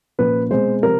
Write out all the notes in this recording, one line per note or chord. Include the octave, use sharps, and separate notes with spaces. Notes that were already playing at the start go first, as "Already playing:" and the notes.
A#2 F3 A#3 C#4 B4
B2 G#3 C4 C5
C3 F3 A#4